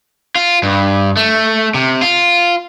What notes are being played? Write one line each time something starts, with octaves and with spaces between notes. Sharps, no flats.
F4
G2
A3
C3
F4